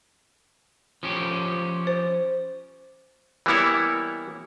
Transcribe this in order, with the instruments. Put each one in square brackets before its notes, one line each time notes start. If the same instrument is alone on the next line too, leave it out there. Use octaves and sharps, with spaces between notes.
[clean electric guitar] F3 C#4 G4
[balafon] C5
[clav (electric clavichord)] E3 G3 A#3 B3 E4 C#5